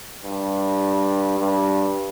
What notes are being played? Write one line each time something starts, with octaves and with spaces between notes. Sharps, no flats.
G2
G2